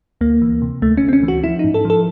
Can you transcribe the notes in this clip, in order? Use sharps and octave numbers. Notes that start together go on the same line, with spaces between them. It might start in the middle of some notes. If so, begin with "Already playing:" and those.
D2 A#3
E3
C3
D2 A3
C#4
D2
C4
C#4
E3
F#4
F3 E4
G#2 D#4
A4
F3 A4